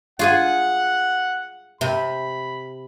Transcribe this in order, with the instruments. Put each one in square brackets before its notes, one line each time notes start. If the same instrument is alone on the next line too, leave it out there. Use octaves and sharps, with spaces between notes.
[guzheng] F4 G#4 G#5 [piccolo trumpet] F#5
[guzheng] C3 [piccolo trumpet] B5